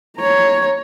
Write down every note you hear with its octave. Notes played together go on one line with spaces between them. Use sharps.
C#5 A#5